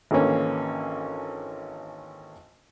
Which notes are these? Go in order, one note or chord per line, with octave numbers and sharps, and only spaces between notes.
G#1 D3 E3 A#3 C#4